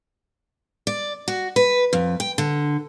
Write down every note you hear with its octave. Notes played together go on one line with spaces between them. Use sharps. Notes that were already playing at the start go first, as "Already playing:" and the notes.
D5
F#4
B4
F2
G5
D3